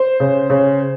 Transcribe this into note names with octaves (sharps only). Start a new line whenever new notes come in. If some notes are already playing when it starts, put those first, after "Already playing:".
Already playing: C5
C#3
C#3